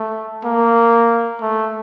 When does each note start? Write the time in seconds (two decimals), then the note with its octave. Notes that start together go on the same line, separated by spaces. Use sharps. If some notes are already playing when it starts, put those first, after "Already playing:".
Already playing: A3
0.44 A#3
1.41 A3